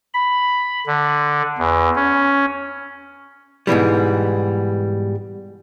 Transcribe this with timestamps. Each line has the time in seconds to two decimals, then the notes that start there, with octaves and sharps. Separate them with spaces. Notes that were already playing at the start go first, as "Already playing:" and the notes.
0.14 B5
0.87 D3
1.58 E2
1.96 C#4
3.67 G#2 B2 E3 G3